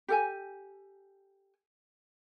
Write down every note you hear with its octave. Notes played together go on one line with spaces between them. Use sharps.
G4 A4 G#5